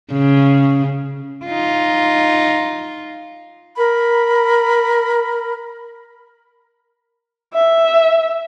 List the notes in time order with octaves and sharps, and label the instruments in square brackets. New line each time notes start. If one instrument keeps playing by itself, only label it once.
[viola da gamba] C#3
[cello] D#4 F4
[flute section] A#4 B5
[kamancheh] E5